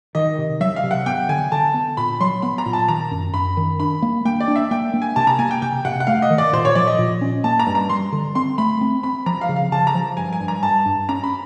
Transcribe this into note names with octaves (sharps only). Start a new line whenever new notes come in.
D#3 D#5
C3
F#3 E5
F5
C3
F#5
B3 G5
D3 G#5
D3 A5
B3
A#2 B5
F#3 C6
B3 B5
A#5
A#2
A5
D#3 A#5
F#2
F#2 B5
D#3
D4 B5
A#3
A#3 G5
D5
D4
E5
A#3 G5
A#3
G#5
C3 A5
A#5
A#3 G#5
G5
C3 G5
C3 F#5
F#5
A3 F5
D#5
D#3
D5
A#2 C5
C#5
F3 D5
D#5
A#2
C#4
A#3 A5
A#5
G2
A#5
G3 C6
D3
C4 C6
A3 B5
C4
C4 B5
F3 A#5
F5
C#3
F5
C#3 A5
A#5
F3
G2 G#5
G#5
G2
A#5
G2 A5
G2
C#4 A#5
B5